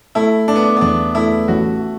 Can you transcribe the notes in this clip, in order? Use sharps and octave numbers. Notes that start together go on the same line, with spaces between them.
A3 E4
A3 D4
B3
D4
B3
E2 D4
A3 E4
A1 F#4